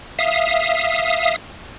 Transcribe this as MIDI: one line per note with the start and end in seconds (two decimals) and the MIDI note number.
0.19 1.36 76
0.19 1.36 77
0.19 1.36 87